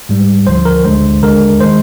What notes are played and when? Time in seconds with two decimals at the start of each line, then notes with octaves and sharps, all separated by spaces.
0.09 G#2 G3
0.47 D2 D3 F3 C5
0.65 A#4
0.84 D2 D3 G#3 C5
1.22 D#2 D3 G#3 A#4
1.61 D#3 G#3 C5